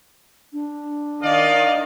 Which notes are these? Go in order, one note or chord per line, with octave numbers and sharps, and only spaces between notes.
D4
D#3 D5 D#5 F5